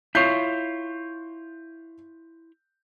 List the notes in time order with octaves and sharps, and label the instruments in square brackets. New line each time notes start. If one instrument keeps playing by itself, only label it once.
[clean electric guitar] E4 F4 C#5 [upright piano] G6 C7